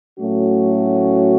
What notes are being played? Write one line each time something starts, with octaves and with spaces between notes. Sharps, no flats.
A2 F#3 A3 C#4 F#4